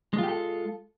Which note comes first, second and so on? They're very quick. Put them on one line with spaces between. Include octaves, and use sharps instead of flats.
G#3 F4 G4 A4